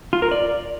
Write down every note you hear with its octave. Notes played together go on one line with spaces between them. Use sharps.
F4
A#4
D5